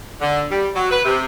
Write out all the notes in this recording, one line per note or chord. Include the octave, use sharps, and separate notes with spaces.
D3
G3
F#3
B4
C3